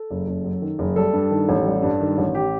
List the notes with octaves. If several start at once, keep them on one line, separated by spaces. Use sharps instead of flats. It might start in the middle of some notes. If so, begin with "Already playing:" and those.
Already playing: A4
F#1
F#1
F#2
D#3
F#1
G3 A4
G2
D#3
A1
G3
G2
D#3
A1
G4